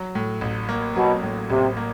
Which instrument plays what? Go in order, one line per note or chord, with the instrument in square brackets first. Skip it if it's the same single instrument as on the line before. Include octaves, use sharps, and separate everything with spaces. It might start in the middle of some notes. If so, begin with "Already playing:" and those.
Already playing: [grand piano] F#3
A2
A1
A#3
[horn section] B2 [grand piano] F#3
[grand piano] A2
[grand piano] A1 [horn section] C3
[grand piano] A#3